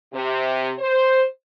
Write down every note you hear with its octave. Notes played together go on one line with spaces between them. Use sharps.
C3
C5